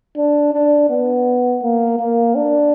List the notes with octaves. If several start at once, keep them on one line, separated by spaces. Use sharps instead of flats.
D4
D4
B3
A#3
A#3
D4